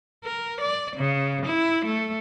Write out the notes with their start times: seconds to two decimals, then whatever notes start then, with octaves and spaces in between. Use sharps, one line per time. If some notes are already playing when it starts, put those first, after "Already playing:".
0.24 A#4
0.61 D5
0.96 C#3
1.45 E4
1.85 A3